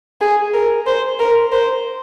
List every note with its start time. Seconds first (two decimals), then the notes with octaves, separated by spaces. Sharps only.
0.21 G#4
0.54 A#4
0.86 C5
1.19 A#4
1.52 C5